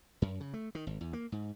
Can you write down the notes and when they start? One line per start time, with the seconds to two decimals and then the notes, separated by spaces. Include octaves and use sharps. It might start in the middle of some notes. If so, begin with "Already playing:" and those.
0.22 F#2
0.40 C#3
0.54 A3
0.75 D#3
0.87 G#1
1.01 E2
1.13 A#3
1.32 G#2